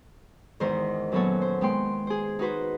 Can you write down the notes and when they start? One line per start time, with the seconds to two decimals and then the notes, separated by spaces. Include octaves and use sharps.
0.60 E2 G#2 D#3 A#4 C5
1.12 F#2 A#2 F#3 B3 A4 C#5
1.42 C5
1.61 G#3 B3 G5 C6
2.07 G#4 C5
2.39 D#4 F#4 B4 C5